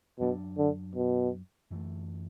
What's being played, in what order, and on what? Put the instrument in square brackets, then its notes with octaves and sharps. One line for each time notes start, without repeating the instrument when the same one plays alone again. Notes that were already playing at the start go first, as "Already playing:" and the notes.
[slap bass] F#2 F#3 D4 [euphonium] B2
[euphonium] D3
B2
[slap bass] F#2 E3 A3